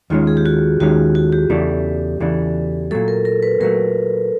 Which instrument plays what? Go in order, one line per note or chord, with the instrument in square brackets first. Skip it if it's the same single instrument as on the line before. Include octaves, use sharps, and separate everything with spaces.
[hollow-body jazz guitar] D#2 D#3 G#3 C#4 [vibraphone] F4
[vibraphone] G#4
G4
F#4
[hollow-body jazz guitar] D#2 D#3 G#3 C#4 [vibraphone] F#4
[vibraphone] F#4
G4
[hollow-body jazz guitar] E2 C#3 E3 A3 D4
E2 C#3 E3 A3 D4
[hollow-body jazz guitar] A#2 F#3 A3 [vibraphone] A4
[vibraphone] A#4
A#4
B4
[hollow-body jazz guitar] A#2 F#3 A3 [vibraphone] A#4